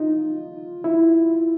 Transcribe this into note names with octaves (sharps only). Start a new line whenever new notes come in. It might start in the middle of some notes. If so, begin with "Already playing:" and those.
Already playing: D#4 F4
E4